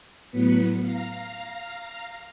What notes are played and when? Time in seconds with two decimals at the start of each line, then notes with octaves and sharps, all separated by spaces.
0.31 A2 F#3 B3 B4 B6 C#7
0.80 F5 A#5